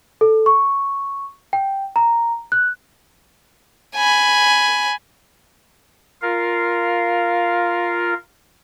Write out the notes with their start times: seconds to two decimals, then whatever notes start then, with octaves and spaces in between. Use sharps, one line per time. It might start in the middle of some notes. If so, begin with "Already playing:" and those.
0.21 A4
0.46 C#6
1.53 G5
1.96 A#5
2.52 F#6
3.95 G#5 B5
6.22 F4 A#4 F5